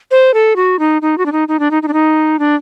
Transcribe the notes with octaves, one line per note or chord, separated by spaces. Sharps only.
C5
A4
F#4
D#4
D#4
F#4
D4
D#4
D#4
D4
D#4
D#4
D4
D#4
D4